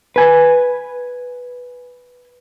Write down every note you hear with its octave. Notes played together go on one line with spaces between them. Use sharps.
B4 G#5